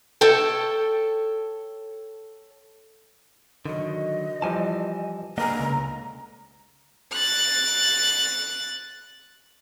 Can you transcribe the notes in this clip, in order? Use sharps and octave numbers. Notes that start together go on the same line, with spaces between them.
A4 C#5 G5 A5
D3 D#3 F#3 D#5
E3 F3 G3 G#5 A5
D3 A#3 G#4 B4 D#5 F#5 A#5
C#2
F#6 A6